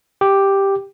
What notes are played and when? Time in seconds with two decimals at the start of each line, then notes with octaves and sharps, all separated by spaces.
0.21 G4